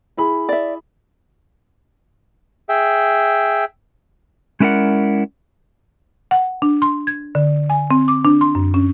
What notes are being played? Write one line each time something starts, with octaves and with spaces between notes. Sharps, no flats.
E4 G#4 B5
D5 E5
G#4 E5 G5
G#3 C#4 E4 A#4 D5 F#5
F#5
D4
C6
G#6
D3
G#5
C4
D6
D4
C6
F#2
C#4